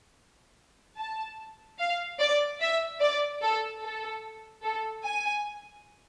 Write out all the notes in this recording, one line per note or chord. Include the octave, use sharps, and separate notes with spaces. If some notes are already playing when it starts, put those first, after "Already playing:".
A5
F5
D5
E5
D5
A4
A4
A4
G#5